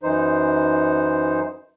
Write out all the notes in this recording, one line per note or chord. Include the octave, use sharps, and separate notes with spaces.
F#2 E3 D#4 C5